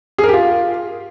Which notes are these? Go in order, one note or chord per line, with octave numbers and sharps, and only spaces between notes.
G#4
A#4
G4
F4